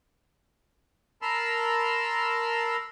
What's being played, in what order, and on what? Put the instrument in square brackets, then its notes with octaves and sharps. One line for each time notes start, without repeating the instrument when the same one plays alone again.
[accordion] A#4 A5 B5 C6 E6 F6